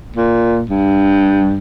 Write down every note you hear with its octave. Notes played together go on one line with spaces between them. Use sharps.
A#2
G2